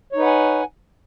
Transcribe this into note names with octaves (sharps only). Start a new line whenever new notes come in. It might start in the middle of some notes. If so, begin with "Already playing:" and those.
D#4 B4 C#5 F#5 G#5